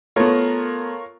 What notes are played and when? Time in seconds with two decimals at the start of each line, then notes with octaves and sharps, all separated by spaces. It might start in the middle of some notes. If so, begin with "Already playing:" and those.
0.16 A3 B3 F4 A#4 C#5